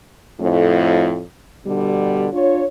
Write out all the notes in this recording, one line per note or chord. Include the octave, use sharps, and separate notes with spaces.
F2 A2
B2 D3 G3
D4 F4 C#5